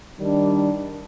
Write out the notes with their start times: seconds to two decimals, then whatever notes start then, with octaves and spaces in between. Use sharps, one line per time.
0.19 D#3 G3 D4